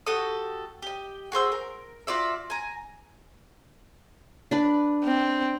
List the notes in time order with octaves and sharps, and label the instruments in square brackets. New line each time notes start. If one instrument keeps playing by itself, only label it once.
[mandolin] F#4 G4 A4 D#6
G4 D#5
F#4 G#4 C5 E6
A#4
F4 F#4 D5 E5
G#5 A#5
[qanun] D4 B4
[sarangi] C4